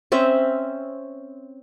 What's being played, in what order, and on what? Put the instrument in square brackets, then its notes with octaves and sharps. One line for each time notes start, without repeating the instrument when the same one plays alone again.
[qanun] C4 C#4 E5